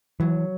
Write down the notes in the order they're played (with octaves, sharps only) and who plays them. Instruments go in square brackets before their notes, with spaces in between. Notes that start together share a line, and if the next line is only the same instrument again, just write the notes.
[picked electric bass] E3 [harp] F#3